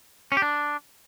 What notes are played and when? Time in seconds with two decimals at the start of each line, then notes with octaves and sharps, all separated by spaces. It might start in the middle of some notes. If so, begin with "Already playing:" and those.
0.32 C#4
0.37 G4
0.42 D4